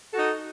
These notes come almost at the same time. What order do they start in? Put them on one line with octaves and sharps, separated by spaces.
A4 F#4 D#4